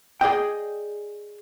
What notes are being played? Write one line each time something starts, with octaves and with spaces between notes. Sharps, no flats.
G#4 D5 D#5 G5